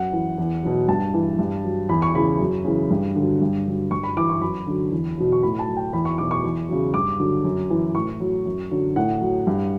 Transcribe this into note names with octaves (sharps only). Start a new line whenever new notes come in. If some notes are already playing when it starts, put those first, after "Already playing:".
Already playing: F#2 F#5
E3
E2
B2 F#3
G2 A5
E3
G2
F#3
E2 B5
C#6
C#3 E3 B5
F#2
C#3 E3
G2
D3 F#3
G2
D3 F#3
G2 C#6
B5
E3 D6
C#6
F#2 B5
D3 F#3
E2
B2 F#3
C#6
A2 B5
A5
F#3
G5
E2 B5
C#6
B2 F#3 D6
C#6
E2
C#3 F#3
G2 D6
D3 F#3
F#2
E3
A2 C#6
F#3
F#2
D3 F#3
A2 F#5
F#3
G2